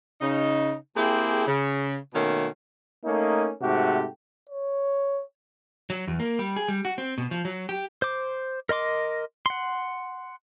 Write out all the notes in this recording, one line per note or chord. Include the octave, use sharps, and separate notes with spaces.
C#3 D#4
A#3 C4 E4 G4 G#4
C#3
B2 D#3 A3 A#3 C#4 F#4
A3 A#3 C#4 D#4
G#2 C3 A3 F#4 G4
C#5
F#3
E2
A#3
G3
G#4
G3
F#4
C4
B2
F3
F#3
G4
C5 D6
A#4 D#5 C6 D6
F#5 C6